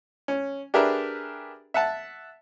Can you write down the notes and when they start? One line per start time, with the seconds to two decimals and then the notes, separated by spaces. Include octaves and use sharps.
0.28 C#4
0.74 D4 G4 G#4 A#4 B4 E5
1.74 E5 F#5 A5